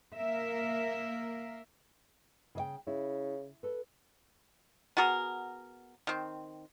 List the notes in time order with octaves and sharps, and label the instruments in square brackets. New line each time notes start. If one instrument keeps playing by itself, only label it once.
[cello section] A#3 A#4 E5
[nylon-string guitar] C#3 D#5 G5
[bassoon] C#3 [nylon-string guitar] E4
[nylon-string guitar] A4 B4
[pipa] B3 F#4 G#4 A#4
D#3 C4